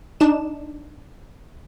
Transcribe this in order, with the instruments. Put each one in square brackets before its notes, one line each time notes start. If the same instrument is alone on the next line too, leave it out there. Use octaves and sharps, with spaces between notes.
[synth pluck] D4 D#4 E7